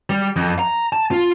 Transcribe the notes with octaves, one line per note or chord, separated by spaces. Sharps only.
G3
F2
A#5
A5
F4